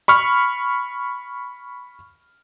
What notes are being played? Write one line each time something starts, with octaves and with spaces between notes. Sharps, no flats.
B5 C#6 F6